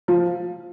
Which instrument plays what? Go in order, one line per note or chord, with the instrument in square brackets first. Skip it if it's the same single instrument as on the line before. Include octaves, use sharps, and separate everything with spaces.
[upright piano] F3